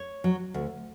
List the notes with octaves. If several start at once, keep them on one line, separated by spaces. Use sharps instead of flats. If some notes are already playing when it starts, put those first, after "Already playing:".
Already playing: C#5
F#3
D2